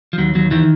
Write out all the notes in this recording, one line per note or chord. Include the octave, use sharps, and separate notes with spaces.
F3
D#2 F#3
D#2 F#3
D#3 E3